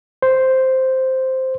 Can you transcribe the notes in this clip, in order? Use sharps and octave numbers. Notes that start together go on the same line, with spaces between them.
C5